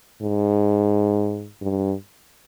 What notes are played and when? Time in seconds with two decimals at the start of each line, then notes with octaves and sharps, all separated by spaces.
0.22 G#2
1.62 G2